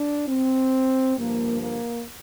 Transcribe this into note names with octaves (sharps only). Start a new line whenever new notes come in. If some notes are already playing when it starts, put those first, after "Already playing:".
Already playing: D4
C4
G2 D3 F3 A#3
A#3